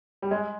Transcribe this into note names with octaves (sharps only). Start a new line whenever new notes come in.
G3
G#3